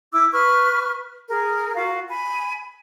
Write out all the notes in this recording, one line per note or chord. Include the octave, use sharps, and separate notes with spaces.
E4 D6 E6
B4 C#6 F6
G#4 A#4
F4 F#4 F5
G#5 B5